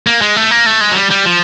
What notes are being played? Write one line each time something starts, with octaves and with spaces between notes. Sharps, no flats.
A#3
G#3
A3
A#3
A3
G#3
F#3
G3
G3
F3